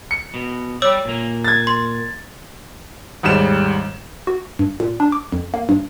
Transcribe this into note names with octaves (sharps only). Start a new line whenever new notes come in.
C#7
B2
G3 C#5 D5 E6
A#2 A#3
G#6 A6
C6
D#2 G#2 G3 E7
F#4
G2
A#2
D4
D6
F2
A#3
G2